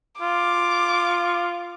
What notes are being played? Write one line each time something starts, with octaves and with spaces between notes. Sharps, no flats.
F4 D6